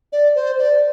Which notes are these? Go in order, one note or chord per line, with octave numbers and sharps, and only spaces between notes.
D5
C5
D5